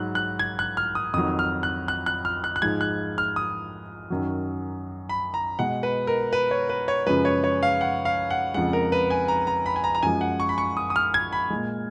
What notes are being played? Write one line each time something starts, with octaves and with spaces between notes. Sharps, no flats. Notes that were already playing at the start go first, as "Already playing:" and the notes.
Already playing: G#2 F#3 F#6
F#6
G#6
F#6
F6
D#6
F2 D#3 F#3 D#6
F6
F#6
F#6
F#6
F6
F#6
F#6
G#2 F3 G#3 G#6
F#6
F6
D#6
F#2 D#3 F#3
B5
A#5
B2 G#3 F#5
B4
A#4
B4
C#5
B4
C#5
F#2 C#3 F3 G#3 B4
C#5
C#5
F5
F#5
F5
F#5
F2 C#3 F3 G#3 F#5
A#4
B4
G#5
A#5
A#5
B5
G#5
A#5
A#5
F#2 F3 G#3 G#5
F#5
C#6
B5
C#6
D#6
D#6
F6
G#6
B5
A#2 G#3